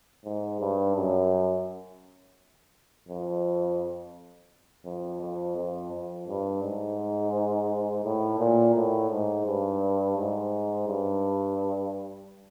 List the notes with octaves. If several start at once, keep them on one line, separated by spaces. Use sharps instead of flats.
G#2
G2
F#2
F2
F2
F2
F2
F2
G2
G#2
A2
A#2
A2
G#2
G2
G#2
G2